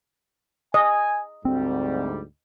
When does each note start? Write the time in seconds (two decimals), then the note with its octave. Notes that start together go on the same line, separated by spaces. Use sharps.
0.74 D#5 G#5
1.45 D2 G#2 G3 C4